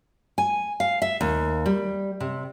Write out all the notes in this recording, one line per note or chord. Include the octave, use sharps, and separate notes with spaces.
G#5
F5
E5
D#2
G3
C3